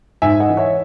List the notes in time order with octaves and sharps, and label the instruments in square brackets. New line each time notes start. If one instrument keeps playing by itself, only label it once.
[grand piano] G#2 E5 G#5
D#5 F#5
E3
C#5 E5